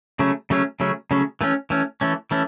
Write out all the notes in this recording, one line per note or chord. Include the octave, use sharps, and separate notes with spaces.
C#3 F#3 A3 C#4
C#3 F#3 A3 C#4
C#3 F#3 A3 C#4
C#3 F#3 A3 C#4
E3 A3 C#4
E3 A3 C#4
E3 A3 C#4
E3 A3 C#4